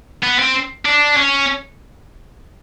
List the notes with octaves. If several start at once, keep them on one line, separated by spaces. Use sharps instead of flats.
B3
C4
D4
C#4